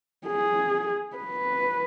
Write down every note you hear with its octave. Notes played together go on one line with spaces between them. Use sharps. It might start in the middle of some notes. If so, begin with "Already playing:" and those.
G#4
B4